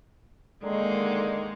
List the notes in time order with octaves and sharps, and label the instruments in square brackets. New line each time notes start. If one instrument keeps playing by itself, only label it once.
[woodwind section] D3 D#3 [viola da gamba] G#3 A#3 D#4